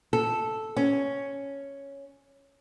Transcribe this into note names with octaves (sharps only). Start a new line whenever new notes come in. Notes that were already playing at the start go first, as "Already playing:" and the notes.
A4
C#4